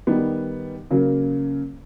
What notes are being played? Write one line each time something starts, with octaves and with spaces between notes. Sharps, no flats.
D#3 G3 B3 D#4
C#3 F#3 A#3